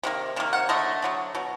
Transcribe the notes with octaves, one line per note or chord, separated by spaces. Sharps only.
C3 D#3 A#3
C3 D#3 A#3
F#5
D3 F#3 A3 D#5
D3 F#3 A3
B2 F#3